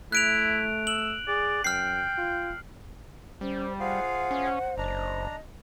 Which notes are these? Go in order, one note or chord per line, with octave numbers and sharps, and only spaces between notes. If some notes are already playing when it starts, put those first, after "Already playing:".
A3 E4 F#6 D7 F7
E6 F#7
G#4 D5
F#2 G5 F6 C7
F4
G3 C#4 C5
F4 G#4 C5 F5 F#5
C#4
F#1 D4 D#5 A#5